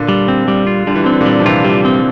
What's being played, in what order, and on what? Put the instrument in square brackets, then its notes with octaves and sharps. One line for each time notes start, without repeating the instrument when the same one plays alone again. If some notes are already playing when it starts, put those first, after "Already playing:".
Already playing: [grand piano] A#2 D3
[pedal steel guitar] G3
C4
G3
F4
[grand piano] D3 [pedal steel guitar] G3
[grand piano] E3
[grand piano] D3 [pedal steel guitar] C4
[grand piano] E3
A#2 D3
[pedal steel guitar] G3
[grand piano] F3
[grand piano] C3 E3 [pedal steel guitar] F4
[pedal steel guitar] G3
C4